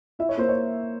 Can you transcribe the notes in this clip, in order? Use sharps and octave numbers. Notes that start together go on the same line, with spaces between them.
E4 E5
C#5
A#3 C5
C#5